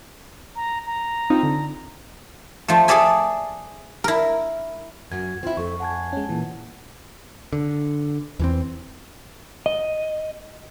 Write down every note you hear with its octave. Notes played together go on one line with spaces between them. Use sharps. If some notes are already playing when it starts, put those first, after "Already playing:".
A#5
A#5
C4 D#4 F4
D3
F3 A3
G#4 A4 D5 E5 G#5
E4 A#4
F#2 F#4 G#6
C4 E4 F4
F2 A4 C#6
F#5 G#5 A5 G#6
G#3 C#4
A#2 E3
D3
E2 E3 C4
D#5